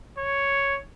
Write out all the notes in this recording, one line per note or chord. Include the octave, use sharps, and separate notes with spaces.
C#5